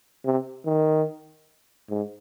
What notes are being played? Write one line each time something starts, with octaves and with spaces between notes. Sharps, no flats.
C3
D#3
G#2